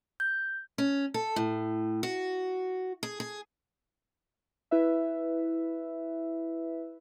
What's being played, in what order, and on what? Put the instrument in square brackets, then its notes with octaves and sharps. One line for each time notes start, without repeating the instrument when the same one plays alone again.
[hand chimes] G6
[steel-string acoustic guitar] C#4
A4
A2
F#4
G#4
G#4
[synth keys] E4 B4 E5